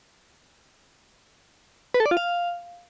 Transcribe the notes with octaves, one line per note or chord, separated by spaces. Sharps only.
B4
A4
D5
F4
F5